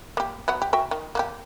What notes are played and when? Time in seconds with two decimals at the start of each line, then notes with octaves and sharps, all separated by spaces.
0.17 A#3 G4
0.48 F#3 B3 F#5
0.62 G4
0.73 F#4 E5 G5
0.91 D#3
1.15 A#3 F#4 G4